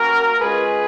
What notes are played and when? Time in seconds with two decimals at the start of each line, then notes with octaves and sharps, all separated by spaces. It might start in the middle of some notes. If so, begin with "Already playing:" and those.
Already playing: A#3 C#4 F#4 A#4
0.40 G#3 C#4 F4 G#4 B4